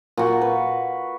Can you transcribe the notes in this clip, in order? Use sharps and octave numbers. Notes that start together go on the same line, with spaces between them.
A#2 F#4
B4